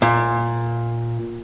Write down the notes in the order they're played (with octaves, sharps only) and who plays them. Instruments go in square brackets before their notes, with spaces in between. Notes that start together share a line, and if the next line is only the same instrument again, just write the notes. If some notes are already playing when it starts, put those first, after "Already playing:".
[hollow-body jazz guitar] A#2